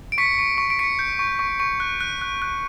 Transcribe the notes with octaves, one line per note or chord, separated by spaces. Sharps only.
D7
C#6 B6 C#7
C#6
C#6
D7
C#6 B6 C#7
G6
C#6
C#6
C#6
F#6
F#6
F#6
F#6